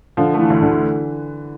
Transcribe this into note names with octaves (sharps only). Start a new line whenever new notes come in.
D3 F3
E3 A3
D2
D3